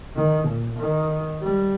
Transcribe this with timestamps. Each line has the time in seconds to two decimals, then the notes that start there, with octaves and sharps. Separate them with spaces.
0.16 D#3
0.48 A#2
0.79 D#3
1.42 G3